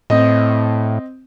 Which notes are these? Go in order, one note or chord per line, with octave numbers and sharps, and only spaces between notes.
A2 C4 D#5